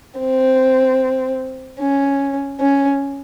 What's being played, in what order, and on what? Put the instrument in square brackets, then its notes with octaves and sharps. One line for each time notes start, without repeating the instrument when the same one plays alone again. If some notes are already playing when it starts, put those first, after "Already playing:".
[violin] C4
C#4
C#4